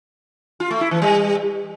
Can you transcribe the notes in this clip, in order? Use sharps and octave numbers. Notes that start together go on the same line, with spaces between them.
F4
A3
E4
E3
G3